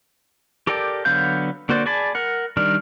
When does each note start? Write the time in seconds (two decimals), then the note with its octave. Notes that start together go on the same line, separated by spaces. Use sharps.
0.67 G4 A4 A#4 D5 G5
1.05 D3 F#3 B3 F5 G6
1.69 D3 A#3 F#4 C5 D5
1.86 G#4 D5 G#5 A5 B5
2.15 A#4 F#5
2.57 D#3 G3 D4 A#4